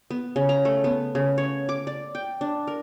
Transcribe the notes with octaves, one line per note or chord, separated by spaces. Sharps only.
B3
C#3
A#5
A3
B3
C#3
C#5
D6
D5
G5
D4
A#4